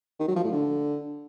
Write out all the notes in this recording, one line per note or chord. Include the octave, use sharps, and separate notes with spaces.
D#3
F#3
F3
A2
D3